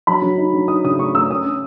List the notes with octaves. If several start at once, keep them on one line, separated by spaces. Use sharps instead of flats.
F#3 B5
F#3
D#4
F#3
D#4 D#6
C#3 D#6
A3 C#6
A3 E6
C#4 D#6
C#4